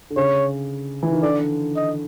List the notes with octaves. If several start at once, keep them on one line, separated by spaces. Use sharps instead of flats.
D3
C#3 C#5
E3
D#3
D3 D5
D#5